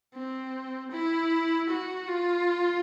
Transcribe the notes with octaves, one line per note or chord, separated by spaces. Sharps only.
C4
E4
F#4
F4